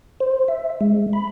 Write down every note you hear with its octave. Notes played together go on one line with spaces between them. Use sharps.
C5
E5
G#3
B5